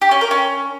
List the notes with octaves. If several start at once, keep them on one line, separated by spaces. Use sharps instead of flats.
G4
C#4
A#4
C#4